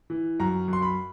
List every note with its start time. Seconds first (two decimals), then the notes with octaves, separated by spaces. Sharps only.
0.10 E3
0.40 F#2 A#5
0.68 F#2
0.73 C6
0.82 B5